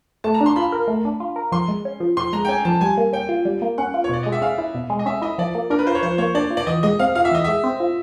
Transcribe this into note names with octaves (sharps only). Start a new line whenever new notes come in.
A3 A5
A#5
D4
C6
F4 B5
A#4
A3
D4
F4
A#4
F3 C6
G#3
C#4
F3
F3 C6
G#3 A#5
G5
C#4 G#5
F3 A5
G3 G#5
A#3
C#4 G5
F4
G3
A#3
C#4 F#5
F4
C#5
B2 D5
G#3 D#5
E5
C#4 F5
E4
B2
G#3
D#5
C#4 E5
E4 D#5
F3 D5
A#3
D4 A#4
B4
F4 C5
C#5
F3 C5
A#3 C#5
D4 D5
F4
D5
E3 D#5
G#3 D#5
C4 F5
F4 F5
E5
E3 D#5
G#3 E5
C4
F4